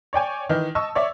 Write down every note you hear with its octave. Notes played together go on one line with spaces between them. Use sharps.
C#5 D5 G5 G#5
D#3 E3
D#5 A5 C#6 E6
C#5 D5 E5